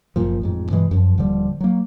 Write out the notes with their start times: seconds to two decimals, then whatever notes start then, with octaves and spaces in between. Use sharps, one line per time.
0.16 F#1 C#2 A#2 F3
0.41 A1 F2 G#2
0.71 G2 B2 E3 G#3
0.91 F#2 F3
1.18 D#1 D3 F3 G3
1.61 F#3 A#3